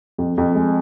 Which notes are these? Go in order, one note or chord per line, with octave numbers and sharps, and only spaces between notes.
F2
F2
G#3